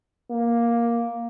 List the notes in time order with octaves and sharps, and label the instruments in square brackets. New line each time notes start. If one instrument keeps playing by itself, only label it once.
[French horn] A#3